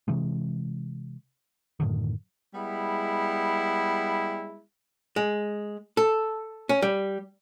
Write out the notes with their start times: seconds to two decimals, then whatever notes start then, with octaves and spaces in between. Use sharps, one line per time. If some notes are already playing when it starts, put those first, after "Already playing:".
0.08 C3 E3 G#3
1.80 F#2 A2 D3 D#3
2.54 G3 G#3 B3 E4
5.16 G#3
5.97 A4
6.69 C#4
6.82 G3